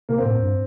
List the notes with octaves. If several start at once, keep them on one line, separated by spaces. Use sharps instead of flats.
C3 A#3
A2 C4
G2